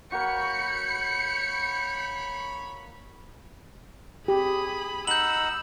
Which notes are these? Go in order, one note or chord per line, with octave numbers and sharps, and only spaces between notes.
A#3 F#4 C#5 B5 G6 C#7
G4 G#4 B5
D#4 F#5 B5 E6 G6 F#7